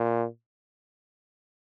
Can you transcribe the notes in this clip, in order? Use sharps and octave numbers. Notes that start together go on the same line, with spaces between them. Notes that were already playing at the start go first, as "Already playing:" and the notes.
Already playing: A#2